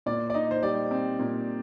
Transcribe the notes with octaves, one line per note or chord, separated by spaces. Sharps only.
A#2 D5
D5
D#4 D#5
C5
G3 D5
C4
A#2